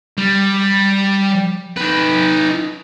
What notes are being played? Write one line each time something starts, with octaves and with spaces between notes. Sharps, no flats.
G3
D#4 B4